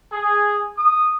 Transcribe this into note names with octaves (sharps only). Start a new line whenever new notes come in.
G#4
D#6